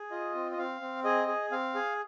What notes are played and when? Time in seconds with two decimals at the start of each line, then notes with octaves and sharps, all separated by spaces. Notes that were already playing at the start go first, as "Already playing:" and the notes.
Already playing: G#4
0.11 F4 D#5
0.34 C4
0.51 D#5
0.58 C4 F5
0.81 C4
1.04 G#4 D#5
1.28 G#4
1.51 C4 F5
1.75 G#4